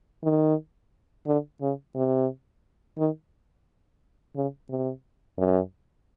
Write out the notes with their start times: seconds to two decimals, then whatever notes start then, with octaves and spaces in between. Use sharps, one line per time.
0.23 D#3
1.26 D3
1.61 C#3
1.95 C3
2.98 D#3
4.35 C#3
4.69 C3
5.38 F#2